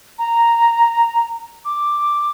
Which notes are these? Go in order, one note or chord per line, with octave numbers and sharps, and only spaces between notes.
A#5
D6